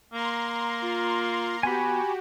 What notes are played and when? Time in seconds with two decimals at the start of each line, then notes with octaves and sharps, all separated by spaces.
0.13 A#3 A#5 C6
0.82 F4
1.63 B3 F#4 G4 G#5 B5